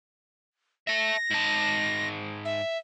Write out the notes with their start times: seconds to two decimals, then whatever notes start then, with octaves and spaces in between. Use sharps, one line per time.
0.87 E5 A5 A#6
1.30 G#2 A5
2.45 E5